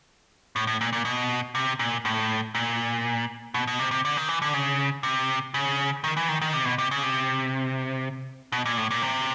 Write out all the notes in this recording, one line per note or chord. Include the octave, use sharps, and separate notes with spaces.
A2
A2
A#2
A#2
B2
C3
A#2
A2
A#2
B2
B2
C3
C3
D3
D#3
E3
D3
C#3
C3
C#3
D#3
E3
D#3
D#3
C3
B2
C3
C#3
C3
B2
A#2
A2
A#2
C3